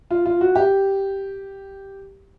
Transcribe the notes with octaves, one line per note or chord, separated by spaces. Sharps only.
F4
F4
F#4
G4